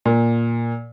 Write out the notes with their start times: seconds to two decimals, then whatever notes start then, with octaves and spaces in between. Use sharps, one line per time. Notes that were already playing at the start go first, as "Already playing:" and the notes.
0.05 A#2